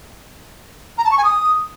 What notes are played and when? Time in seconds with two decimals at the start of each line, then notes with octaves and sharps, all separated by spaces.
0.97 A#5
1.04 A5
1.11 C#6
1.17 G#5
1.24 D#6